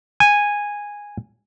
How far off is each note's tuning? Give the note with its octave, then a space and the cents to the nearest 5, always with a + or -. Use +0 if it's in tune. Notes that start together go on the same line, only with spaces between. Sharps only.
G#5 -10